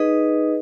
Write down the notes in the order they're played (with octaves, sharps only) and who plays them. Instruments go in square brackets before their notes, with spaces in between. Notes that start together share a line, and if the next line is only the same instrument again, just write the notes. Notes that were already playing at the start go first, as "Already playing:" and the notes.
Already playing: [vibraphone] D#4 G#4 B4 D#5